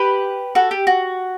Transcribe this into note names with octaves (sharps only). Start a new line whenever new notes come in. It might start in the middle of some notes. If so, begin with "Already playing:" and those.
Already playing: G4 B4
F#4 A4
G4
F#4